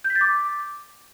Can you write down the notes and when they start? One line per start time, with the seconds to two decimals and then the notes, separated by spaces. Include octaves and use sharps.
0.04 G6
0.10 B6
0.15 A6
0.21 D6